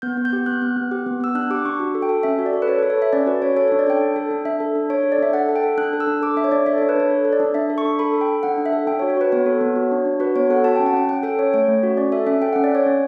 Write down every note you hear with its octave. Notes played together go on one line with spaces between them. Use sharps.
B3 G6
B3
G6
G4
B3 F#6
B3
B3
G4
B3
B3 E6
D4 F#6
G4 D6
D4 C#6
F#4
A4
G5
A4
C#4 E5
F#4
D5
A4
B4
A4 C#5
A4 B4
C#5
A4 E5
C#4 D5
F#4 B4
C#4 C#5
A4 C#5
D4 C#5
D5
A4 G5
D4
A4
D4
D4 E5
A4
D4
D4 C#5
A4
D5
D4 E5
A4 F#5
A4
G5
A4
D4 F#6
A4
E6
D4
A4 D6
D4 E5
C#5
D4 D5
A4 E5
D4 C#5
B4
D4 C#5
A4
A4
D5
D4
D4 E5
A4
C#6
D4
A4 B5
A4
G5
A4
D4 F#5
D4
E5
A4
D4 G5
C#5
F#4
C#5
F#4 B4
B3 C#5
A4
B3
F#4
D4
D4
F#4 B4
B3 C#5
A4 F#5
F#4 A5
C#4 G5
F#5
C#4 G5
C#4 G5
A4 G5
C#4 C#5
A3 C#5
A3
F#4
C#4 D5
A4 E5
C#4 E5
A4 G5
C#4 F#5
D5
C#4 C#5
C#4